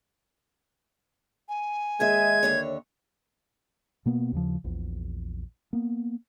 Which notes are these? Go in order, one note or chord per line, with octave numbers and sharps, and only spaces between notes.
G#5
D#2 G#3 G#4 E5 G#6
D#2 D3 C#5
B2 A#3 B3
D#2 C#3 F3
A#1 E2
A#3 B3